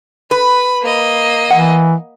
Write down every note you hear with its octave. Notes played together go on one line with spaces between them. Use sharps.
B4 B5
A#3 D#5
E3 F#5